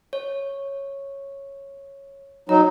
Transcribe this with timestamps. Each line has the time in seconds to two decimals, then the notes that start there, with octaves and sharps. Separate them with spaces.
0.13 C#5
2.49 F#3 D#4 A#5